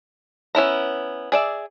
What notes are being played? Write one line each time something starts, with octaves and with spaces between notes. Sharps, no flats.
B3 C#4 E4 A#5
G#4 D5 E5